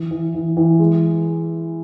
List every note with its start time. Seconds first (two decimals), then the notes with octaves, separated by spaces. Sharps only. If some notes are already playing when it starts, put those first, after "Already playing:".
Already playing: E3
0.11 E3
0.34 E3
0.57 E3
0.79 G#3